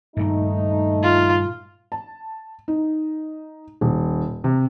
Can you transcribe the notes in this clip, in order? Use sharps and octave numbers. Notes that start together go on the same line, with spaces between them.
G2 A#2 D#3 A3 D#4
F4
A5
D#4
D#1
C3